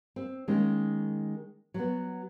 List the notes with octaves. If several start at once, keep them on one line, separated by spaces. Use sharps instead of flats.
C4
D#3 G#3 A#3 C#4
F#3 B3